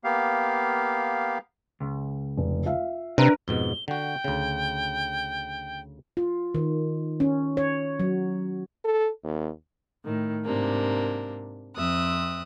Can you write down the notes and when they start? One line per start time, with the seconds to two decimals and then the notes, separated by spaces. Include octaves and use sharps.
0.04 A#3 B3 G4 F5
1.80 C#2
2.37 F1
2.66 F4 E5 F5
3.18 C3 D4 A#4 B4 A#5
3.48 F2 G#2 B2 G7
3.88 D3 F#4 G5
4.24 D2 C#3
6.17 F4
6.55 D#3
7.20 C#4
7.57 C#5
8.00 F#3
8.84 A4
9.24 D#2
10.04 A2 D#3
10.44 G#2 C3 A#3 D4
11.77 F2 C4 E5 D#6 F#6